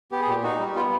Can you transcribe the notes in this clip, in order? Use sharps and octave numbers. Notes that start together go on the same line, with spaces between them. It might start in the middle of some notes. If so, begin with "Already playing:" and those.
B3 G4
G#4
A#2 G4
D#4 F#4
G3
B3 F4